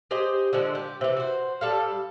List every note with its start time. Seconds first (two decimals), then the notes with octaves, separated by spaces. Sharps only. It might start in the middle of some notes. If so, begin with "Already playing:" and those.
0.11 G4 G#4 C5 D#5
0.53 D3 F3 G#3 C4
0.75 G4
1.01 C3 E3
1.17 F#4 C5
1.61 G3 A4 F5